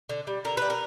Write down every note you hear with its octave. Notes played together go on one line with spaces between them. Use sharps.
D3
G3
D3 A#4
G3 B4
A#4